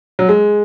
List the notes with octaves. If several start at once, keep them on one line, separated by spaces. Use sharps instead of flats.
F#3
G#3